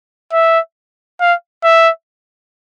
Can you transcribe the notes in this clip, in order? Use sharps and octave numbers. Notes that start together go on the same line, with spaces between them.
E5
F5
E5